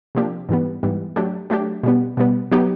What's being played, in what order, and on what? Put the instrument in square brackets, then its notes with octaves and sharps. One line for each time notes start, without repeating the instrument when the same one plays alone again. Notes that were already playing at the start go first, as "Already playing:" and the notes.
[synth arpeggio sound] C3 F3 A#3 D4 G4
G#2 E3 G3 B3
G#2 E3 G3 B3
F#3 A3 D4 G4
F#3 A3 D4 G4
B2 G3 B3
B2 G3 B3
F#3 B3 D#4 G4